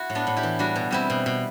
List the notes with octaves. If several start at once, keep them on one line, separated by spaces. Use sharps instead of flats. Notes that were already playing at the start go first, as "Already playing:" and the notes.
Already playing: E4 F#4
A2
B3 D4
A2
E4 G4
E3
G3 D4 F#4
B2
G3 C4 E4
B2
B2